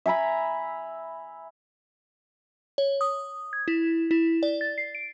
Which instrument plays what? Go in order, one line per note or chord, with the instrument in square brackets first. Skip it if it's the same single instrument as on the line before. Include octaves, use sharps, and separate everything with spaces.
[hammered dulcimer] E5 G#5 A#5 B5
[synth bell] C#5
D#6
G#6
E4
E4
D5
A6
C7
D7